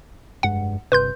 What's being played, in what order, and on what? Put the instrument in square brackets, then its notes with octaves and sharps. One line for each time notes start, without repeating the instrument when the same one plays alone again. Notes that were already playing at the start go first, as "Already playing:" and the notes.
[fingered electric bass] F1 G2 G#3 [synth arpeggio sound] F#5
[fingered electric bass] G1 C3 [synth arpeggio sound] B4 C6 G6